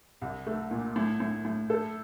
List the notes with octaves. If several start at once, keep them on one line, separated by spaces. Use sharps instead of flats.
C2
A3
A#2
A2
A2
A2
A4